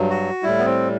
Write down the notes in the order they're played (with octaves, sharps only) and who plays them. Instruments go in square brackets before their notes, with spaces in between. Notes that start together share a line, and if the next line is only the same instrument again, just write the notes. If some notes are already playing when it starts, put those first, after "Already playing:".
Already playing: [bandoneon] G2 F#3
F#4
A2 G3 E4
B3
C4